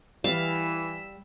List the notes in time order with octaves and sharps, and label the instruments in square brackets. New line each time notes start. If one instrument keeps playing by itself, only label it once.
[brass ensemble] E3 [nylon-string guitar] G3 [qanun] F5 [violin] E6 B6